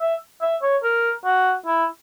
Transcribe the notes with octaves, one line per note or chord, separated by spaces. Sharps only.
E5
E5
C#5
A#4
F#4
E4